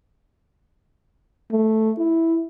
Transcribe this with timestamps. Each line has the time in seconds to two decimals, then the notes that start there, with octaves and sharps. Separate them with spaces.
1.51 A3
1.98 E4